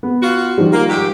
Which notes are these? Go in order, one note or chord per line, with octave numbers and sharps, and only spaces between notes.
B3
F4 F#4
D#3 F3 G3
A#3
G#2 F#4 G4